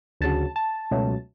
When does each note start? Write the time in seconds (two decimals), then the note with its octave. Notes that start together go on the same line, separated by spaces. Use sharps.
0.21 D2 C#3 F#3 A5
0.56 A5
0.91 C#2 B2 F#3 A3